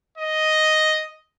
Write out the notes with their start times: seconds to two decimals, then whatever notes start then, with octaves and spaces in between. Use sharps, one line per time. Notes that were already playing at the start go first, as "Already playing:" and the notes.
0.18 D#5